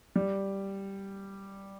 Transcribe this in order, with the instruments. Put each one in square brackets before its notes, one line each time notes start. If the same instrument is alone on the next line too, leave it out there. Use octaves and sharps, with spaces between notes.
[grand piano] G3